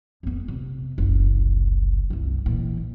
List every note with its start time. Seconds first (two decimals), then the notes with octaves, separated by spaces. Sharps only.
0.23 F2 B3
0.48 C3
0.98 F#1 C2
2.10 C2 F#2
2.46 A#2 E3